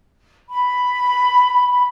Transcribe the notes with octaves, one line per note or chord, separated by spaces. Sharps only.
B5